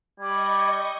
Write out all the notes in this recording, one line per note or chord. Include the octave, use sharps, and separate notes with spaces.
G3 D#5 B5 C#6 D6 G#6